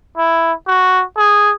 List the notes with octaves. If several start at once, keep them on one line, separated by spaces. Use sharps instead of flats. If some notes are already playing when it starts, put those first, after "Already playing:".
E4
F#4
G#4